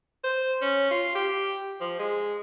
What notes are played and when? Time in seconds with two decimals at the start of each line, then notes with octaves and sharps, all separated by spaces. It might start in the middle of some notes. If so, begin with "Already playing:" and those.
0.24 C5
0.62 C#4
0.91 F4
1.15 G4
1.80 F3
1.99 G#3